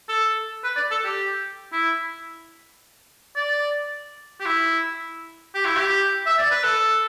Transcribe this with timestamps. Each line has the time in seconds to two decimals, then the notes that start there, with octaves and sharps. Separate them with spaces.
0.08 A4
0.64 B4
0.76 D5
0.91 A4
1.04 G4
1.72 E4
3.36 D5
4.40 G4
4.45 E4
5.54 G4
5.65 E4
5.76 G4
6.26 E5
6.38 D5
6.51 B4
6.64 A4